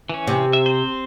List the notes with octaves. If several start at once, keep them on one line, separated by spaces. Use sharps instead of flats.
E3 C#4
C3
E5
C4 C5